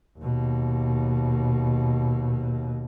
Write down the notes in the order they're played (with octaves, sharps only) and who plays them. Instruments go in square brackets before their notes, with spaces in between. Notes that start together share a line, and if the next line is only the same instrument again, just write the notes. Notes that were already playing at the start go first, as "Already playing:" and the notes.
[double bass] D#2 B2